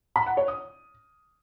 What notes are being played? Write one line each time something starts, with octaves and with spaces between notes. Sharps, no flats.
B5
F#5
C#5
D#6